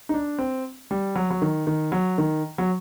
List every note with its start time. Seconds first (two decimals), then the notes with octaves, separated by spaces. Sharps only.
0.09 D#4
0.14 D4
0.39 C4
0.91 G3
1.16 F#3
1.30 F#3
1.42 D#3
1.67 D#3
1.92 F#3
2.18 D#3
2.58 F#3